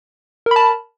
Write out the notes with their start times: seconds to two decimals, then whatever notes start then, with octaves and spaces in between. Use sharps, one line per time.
0.46 A#4
0.51 B5
0.56 A5